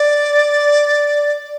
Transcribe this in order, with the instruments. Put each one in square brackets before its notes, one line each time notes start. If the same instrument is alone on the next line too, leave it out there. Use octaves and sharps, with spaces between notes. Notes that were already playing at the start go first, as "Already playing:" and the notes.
Already playing: [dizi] D5